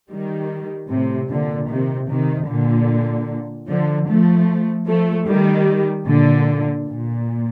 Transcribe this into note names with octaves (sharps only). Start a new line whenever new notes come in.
D#3 G3
A2 C3
A#2 D3
C3 D#3
C3 D#3
A#2 D3
D3 F3
F3 A3
F3 A3
D#3 G3
A#2 D3
A#2